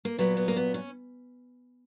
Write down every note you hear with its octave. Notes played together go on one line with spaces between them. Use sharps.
A#3
A#2 F#3 B3
B3
A#3
B3
C#4